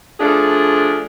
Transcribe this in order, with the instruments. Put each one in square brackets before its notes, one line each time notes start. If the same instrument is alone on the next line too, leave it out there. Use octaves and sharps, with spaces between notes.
[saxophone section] F3 A3 D4 G#4